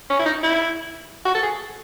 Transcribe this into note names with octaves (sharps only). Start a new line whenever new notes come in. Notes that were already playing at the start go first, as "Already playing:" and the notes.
C#4
E4
D#4
E4
F#4
A4
G#4